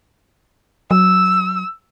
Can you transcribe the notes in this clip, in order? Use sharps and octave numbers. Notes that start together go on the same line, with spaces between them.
F#3 E6